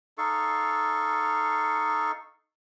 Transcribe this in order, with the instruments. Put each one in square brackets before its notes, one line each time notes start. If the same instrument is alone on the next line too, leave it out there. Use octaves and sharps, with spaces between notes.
[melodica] D#4 A4 F5 C#6